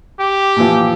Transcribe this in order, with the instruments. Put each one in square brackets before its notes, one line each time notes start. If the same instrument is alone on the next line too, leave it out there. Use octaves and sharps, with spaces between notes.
[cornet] G4
[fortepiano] A#2 E3 F3